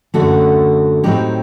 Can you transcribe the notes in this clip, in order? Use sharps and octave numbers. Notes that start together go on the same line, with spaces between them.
F#2 D3 A3 F#4 A4
A2 F#3 C4 D#4 G4